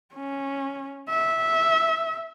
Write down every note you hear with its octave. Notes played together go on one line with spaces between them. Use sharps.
C#4
E5